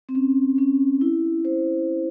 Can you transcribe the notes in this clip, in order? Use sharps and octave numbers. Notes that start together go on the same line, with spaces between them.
C4
C#4
C#4
E4
C5